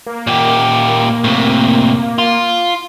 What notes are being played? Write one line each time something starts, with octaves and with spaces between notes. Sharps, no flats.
A#3
A#2 G4
A2 C3
F4